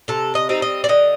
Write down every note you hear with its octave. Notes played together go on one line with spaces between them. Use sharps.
C3 A4
D#5
G3 C4 D#4
D#5
D5
D3 D#5